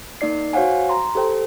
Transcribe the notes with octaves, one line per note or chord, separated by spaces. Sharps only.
A#3 D#4 D5 C7
F#4 C5 C#5 F5 F#5 G#5
A#5 C6
G4 A4 C5 G5